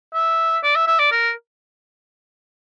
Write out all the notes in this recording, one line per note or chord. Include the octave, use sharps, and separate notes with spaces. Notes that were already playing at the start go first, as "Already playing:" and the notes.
E5
D5
E5
E5
D5
A#4